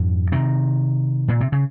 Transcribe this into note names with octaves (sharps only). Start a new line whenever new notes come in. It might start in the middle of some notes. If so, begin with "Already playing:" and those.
Already playing: F2 G#2
C3 D#3
A#2
C3
C#3